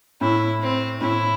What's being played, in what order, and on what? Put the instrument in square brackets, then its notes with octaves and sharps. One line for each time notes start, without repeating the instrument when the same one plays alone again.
[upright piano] A2 [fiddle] E4
[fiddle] C4
[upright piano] A2 [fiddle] E4